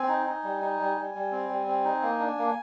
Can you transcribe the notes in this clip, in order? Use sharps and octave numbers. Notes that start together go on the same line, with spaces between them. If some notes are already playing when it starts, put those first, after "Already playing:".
Already playing: C4 G#5
D#4
D#4
G3
D#4
G3
G3
G3
C4
G3
C4
D#4
A#3
D4
A#3